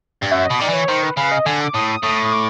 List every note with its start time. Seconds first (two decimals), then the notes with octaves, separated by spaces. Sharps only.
0.22 G2
0.31 F#2 E5
0.45 D#5
0.50 B2
0.59 D#3 D5
0.69 E3 C#5
0.88 D#3 C5
1.03 B4
1.17 C#3 B4
1.32 D#5
1.46 D3 G#5
1.61 D6
1.74 A2 D#6
1.89 D#6
2.03 A2 D#6
2.24 D#6
2.33 D6